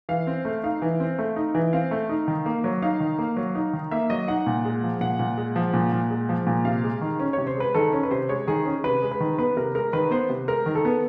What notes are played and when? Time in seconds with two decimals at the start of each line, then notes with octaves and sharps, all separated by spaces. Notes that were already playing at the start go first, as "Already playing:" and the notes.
0.09 E3 F5
0.27 C4
0.45 A3
0.63 D#4 F5
0.82 E3
1.00 C4
1.19 A3
1.36 D#4
1.55 E3
1.73 C4 F5
1.91 A3
2.09 D#4
2.28 D#3
2.46 A#3
2.64 F#3
2.82 D#4 F5
3.00 D#3
3.18 A#3
3.37 F#3
3.55 D#4
3.73 D#3
3.91 A#3 E5
4.10 F#3 D#5
4.28 D#4 F#5
4.46 A#2
4.65 G#3
4.83 F3
5.01 A#2 F#5
5.19 A#2
5.37 G#3
5.56 F3
5.74 A#2
5.92 A#2
6.10 G#3
6.29 F3
6.47 A#2
6.65 C3 F5
6.84 G#3
7.01 D#3
7.19 C#4
7.33 C3 C#5
7.47 C5
7.56 G#3 B4
7.75 D#3 A4
7.93 C#4
8.03 B4
8.11 C3 C5
8.29 G#3 C#5
8.47 D#3 G#4
8.65 C#4
8.84 C3 B4
9.02 G#3
9.11 B4
9.20 D#3
9.38 B3 B4
9.57 C3 A#4
9.75 G#3 A#4
9.93 D#3 B4
10.11 B3 C5
10.29 C3
10.48 G#3 A#4
10.66 D#3
10.75 A4
10.85 B3